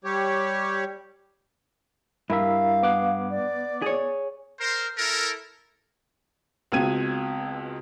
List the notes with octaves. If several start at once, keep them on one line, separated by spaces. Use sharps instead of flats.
G3 G4 C#5
G2 E4 A#4 E5 F5
B3 D6 F#6
D5
G#4 C#5
A#4 C5
E4 A4 A#4
C#2 B2 C4 G#6 D#7